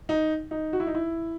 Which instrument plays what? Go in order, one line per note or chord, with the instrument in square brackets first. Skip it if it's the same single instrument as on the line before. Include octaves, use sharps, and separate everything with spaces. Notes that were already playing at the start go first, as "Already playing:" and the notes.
[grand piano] D#4
D#4
F#4
E4
D#4
E4